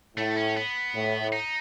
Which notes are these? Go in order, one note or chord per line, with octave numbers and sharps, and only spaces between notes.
A2 A3
C#4
B3
A2
D#4